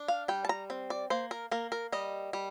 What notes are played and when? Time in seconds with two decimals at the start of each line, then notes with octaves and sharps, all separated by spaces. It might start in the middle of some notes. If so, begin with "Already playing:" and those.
Already playing: D4
0.08 F5
0.28 G3 G5
0.45 A5
0.49 A#5
0.70 C4
0.90 D5
1.10 A#3 C5
1.31 A#4
1.51 A#3 A#4
1.72 A#4
1.92 G3 D#5
2.33 G3